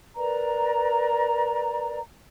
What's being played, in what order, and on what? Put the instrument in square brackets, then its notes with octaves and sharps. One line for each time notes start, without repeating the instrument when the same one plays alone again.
[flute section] A#4 B4 D5 A#5